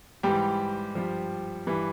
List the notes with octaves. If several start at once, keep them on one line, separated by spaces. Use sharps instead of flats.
G#2 E3 G3 G4
G2 F3
G2 E3